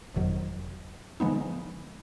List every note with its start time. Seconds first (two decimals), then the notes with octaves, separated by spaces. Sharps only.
0.15 G1 F2 C3 D#3 F#3
1.20 D3 F3 G#3 B3 D#4